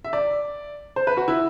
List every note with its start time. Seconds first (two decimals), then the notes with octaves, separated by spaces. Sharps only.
0.04 E5
0.13 D5
0.96 C5
1.07 B4
1.17 F#4
1.28 E4